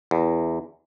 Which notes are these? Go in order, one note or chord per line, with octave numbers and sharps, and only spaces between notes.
E2